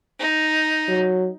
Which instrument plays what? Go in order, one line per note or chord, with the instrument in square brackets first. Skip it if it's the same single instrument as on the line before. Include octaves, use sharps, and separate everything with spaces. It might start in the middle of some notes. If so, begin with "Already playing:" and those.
[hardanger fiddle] D#4
[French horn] F#3